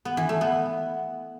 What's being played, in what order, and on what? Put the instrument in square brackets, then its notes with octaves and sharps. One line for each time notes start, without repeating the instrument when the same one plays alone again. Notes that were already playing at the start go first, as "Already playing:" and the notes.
[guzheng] B3
E3
A3
B3